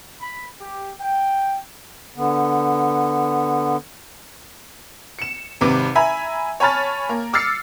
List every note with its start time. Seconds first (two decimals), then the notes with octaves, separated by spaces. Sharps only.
0.20 B5
0.61 G4
1.01 G5
2.17 D3 B3
5.19 C#7 E7
5.61 G#1 C3 B4 D6
5.95 E5 G#5 A#5 B5
6.60 C#5 G#5 A5 B5 F6 A6
7.09 A#3 A#4
7.33 D6 E6 F6 A6 C7 C#7